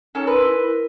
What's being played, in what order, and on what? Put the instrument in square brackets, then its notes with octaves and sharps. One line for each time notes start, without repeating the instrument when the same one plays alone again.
[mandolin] C#4 A4 [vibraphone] D#4 A#5
[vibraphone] A#4 C6 E6 [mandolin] B4
[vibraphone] E4 A#4